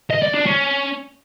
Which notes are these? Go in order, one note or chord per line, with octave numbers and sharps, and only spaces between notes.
D#5
D5
D4
C#4